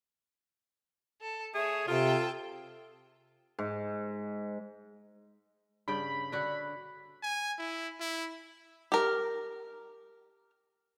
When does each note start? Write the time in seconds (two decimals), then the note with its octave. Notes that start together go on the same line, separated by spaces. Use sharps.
1.21 A4
1.55 A3 G#4 C#5 E5
1.88 C3 F4 A4 G5 A5
3.59 G#2
5.88 G2 C#3 G5 B5
6.32 D3 F#4
7.23 G#5
7.58 E4
8.00 E4
8.92 G4 A#4